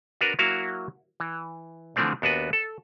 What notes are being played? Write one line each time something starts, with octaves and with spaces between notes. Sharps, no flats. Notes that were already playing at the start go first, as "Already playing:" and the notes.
D4 F#4 A#4 B4
F#3 A#3 E4 F#4 F5
E3
D3 E3 F3 A3 C4 D4
D#2 B3 D4 F#4 B4
A4